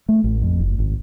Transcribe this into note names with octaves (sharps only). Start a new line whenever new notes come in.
A3
A1
F2
F#1
G#1